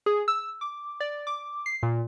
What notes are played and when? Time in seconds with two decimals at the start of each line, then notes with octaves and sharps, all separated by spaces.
0.06 G#4
0.28 E6
0.61 D6
1.00 D5
1.27 D6
1.66 C7
1.83 A#2